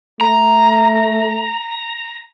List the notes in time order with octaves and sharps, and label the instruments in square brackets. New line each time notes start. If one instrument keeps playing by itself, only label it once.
[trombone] A3 [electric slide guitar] A#5